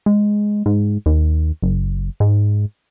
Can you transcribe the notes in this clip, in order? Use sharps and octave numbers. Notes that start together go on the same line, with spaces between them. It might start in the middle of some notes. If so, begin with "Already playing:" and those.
G#3
G#2
D#2
F#1
G#2